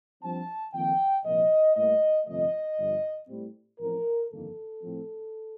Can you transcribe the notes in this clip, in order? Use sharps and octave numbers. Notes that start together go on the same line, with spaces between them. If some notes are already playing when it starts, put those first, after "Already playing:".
G2 F3 C4 A5
F2 D#3 A#3 G5
C2 A#2 F3 A#3 D#5
A2 G3 A#3 D#5
G1 F2 C3 F3 A3 D#5
G1 G2 F3
A2 G3 C4
A1 A2 F3 C4 A#4
G1 F2 D#3 A#3 A4
A2 F3 C4